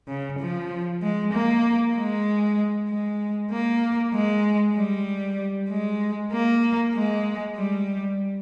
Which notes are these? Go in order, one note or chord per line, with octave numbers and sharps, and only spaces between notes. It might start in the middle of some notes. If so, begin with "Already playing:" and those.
C#3
F3
G#3
A#3
G#3
G#3
A#3
G#3
G3
G#3
A#3
G#3
G3